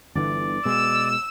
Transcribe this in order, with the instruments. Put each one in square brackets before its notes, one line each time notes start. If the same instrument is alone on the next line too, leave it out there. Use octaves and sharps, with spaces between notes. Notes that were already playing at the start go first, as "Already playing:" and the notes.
[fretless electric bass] G1 D3 E3 [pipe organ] D5
[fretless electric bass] B2 G#3 [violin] E6